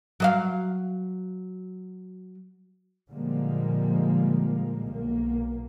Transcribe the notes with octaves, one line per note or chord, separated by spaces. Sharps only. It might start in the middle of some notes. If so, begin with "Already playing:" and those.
F#3 D#5 F5
A#2 D3 F3 G3 G#3 A#3
B1 A#3